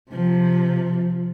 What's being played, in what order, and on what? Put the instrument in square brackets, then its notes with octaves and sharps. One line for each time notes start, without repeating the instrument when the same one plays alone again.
[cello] C3 F3